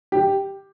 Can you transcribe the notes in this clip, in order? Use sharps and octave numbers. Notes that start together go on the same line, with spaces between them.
G4